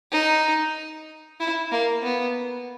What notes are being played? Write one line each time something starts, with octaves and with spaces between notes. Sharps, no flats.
D#4
E4
A#3
B3